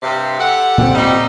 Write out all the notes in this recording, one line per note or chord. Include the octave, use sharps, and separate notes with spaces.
G2 C3
G4 A4 F#5
A#2 C4
G3 D#4